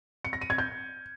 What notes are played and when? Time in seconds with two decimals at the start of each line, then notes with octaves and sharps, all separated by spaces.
0.25 C#7
0.33 A#6
0.41 D#7
0.50 G#6
0.58 G6